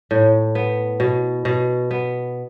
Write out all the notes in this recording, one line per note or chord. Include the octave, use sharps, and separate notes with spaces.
A2
B3
B2
B2
B3